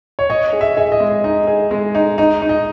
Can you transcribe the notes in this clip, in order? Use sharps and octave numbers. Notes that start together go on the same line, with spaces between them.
C#5
C#5 D#5
G#4
E5
G#4 E5
D#5
G#3
D#4 D#5
G#4
G#3
D#4
D#4 D#5
D#4
D#5